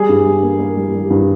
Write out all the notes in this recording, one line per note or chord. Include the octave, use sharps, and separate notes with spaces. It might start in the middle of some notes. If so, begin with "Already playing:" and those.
Already playing: G3 G#4
G2
G3
A#3
A#3
G3
G3
G2